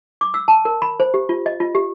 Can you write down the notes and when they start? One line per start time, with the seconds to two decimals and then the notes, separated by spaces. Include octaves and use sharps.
0.21 D6
0.34 E6
0.48 A5
0.65 A#4
0.82 B5
1.00 C5
1.14 G4
1.29 F4
1.46 D#5
1.60 F4
1.75 G4